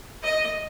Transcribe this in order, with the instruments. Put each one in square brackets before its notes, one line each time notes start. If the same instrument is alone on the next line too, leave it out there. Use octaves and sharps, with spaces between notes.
[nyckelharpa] D#5